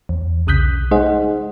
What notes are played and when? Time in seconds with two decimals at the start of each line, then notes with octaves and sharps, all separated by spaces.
0.09 E2
0.47 B1 C#3 D#6 F#6 G6 B6
0.91 G#3 D#4 G#4 C5 D#5 F#5